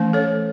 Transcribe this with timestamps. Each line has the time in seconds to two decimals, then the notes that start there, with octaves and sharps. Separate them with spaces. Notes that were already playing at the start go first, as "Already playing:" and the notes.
Already playing: E3 A3 C#4
0.13 A4 C#5